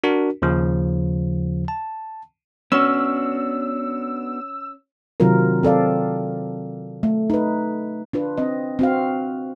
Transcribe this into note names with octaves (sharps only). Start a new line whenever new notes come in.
D4 F#4 A#4
D#2 C#3 F3
A5
B3 C#4 D4 F#4 E6
C3 D#3 F#3 C4 F4 A#4
C4 A4 D5 F5
A3
D#4 B4
D4 F4 B4
C4 D#5
C4 F#4 F5